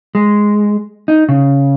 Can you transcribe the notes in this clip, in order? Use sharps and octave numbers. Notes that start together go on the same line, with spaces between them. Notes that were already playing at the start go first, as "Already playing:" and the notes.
G#3
D#4
C#3